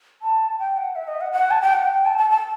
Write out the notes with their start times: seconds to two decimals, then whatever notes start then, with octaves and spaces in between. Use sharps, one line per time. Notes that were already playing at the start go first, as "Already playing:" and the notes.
0.22 A5
0.59 G5
0.77 F#5
0.96 E5
1.08 D#5
1.21 F#5
1.32 F#5
1.51 A5
1.62 G5
1.74 F#5
1.85 G5
2.06 A5
2.18 A5
2.31 A5